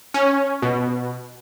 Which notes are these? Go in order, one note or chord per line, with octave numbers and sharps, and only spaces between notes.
C#4
B2